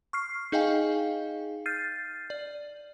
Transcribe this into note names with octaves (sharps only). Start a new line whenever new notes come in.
C#6 F6 C7
D#4 G#4 D#5 F5 G5 G#5
F6 G6 A6 C7 D#7
D5